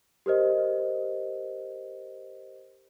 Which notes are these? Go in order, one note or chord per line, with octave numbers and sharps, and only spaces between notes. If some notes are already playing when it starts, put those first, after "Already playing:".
G4 A#4 C5 D#5